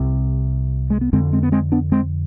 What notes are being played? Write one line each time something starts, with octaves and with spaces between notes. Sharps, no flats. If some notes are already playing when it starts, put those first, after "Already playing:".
Already playing: C2 C3
G#3
B3
F2 D3 G#3 C4
G#3 C4
B3
G#3 C4
B3 D4
G#3 C4